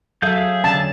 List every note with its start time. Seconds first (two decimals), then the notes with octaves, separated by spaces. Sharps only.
0.22 F#3 G#4 A4 E5 F5 G6
0.64 D3 C#4 A5